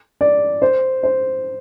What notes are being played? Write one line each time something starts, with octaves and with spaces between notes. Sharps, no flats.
D5
C5
C5